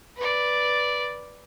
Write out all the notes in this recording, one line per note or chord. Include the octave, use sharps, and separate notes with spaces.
B4 D5